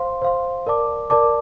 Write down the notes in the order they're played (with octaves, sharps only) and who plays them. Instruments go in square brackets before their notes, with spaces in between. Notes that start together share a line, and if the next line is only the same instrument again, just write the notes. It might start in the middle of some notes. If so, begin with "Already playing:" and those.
Already playing: [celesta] C5 F5 C6
C5 F5 C6
A#4 D5 A5 D6
A#4 D5 A5 D6